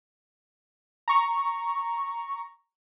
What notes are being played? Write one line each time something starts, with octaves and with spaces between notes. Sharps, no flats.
A#5 C#6